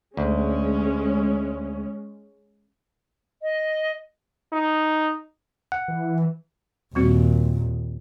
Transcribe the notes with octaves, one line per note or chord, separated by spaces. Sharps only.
D2 G#3 C#4
D#5
D#4
F#5
E3
D#2 A#2 G3 C4 F#4